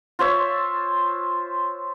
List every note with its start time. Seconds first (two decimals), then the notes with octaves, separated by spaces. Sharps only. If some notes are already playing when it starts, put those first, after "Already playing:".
0.19 F4 C5 C#5 E5